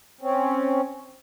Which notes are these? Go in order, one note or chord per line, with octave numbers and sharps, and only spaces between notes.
C4 C#4